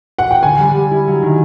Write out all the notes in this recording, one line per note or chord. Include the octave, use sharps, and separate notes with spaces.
F#5
G5
D3 G#5
G3
G3
E4
F#3
D#3